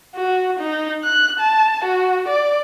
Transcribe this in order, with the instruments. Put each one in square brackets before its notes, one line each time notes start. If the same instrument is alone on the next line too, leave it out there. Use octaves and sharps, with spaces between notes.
[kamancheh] F#4
D#4
F#6
A5
F#4
D5